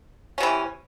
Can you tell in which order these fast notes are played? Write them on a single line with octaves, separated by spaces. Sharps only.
C#4 C3 E3